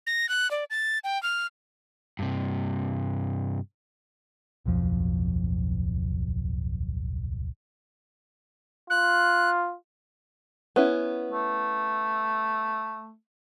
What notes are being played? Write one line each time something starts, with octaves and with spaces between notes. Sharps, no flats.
A#6
F#6
D5
A6
G5
F6
G2 C3
D1 B1 F2 F3
F4 F#6
B3 C#4 E4
A3